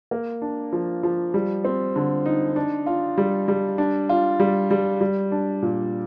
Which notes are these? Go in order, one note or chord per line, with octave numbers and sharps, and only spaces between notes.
A#3
D4
F3
F3
G3
C4
D3
D#4
D4
F4
G3
G3
D4
F4
G3
G3
G3
D4
A#2